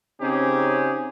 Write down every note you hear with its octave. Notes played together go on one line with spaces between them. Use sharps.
C#3 C4 C#4 D#4 G4 G#4